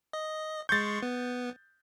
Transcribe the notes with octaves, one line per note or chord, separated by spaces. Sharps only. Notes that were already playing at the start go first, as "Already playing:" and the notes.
D#5
G#3 C6 C#6 G6 A6
B3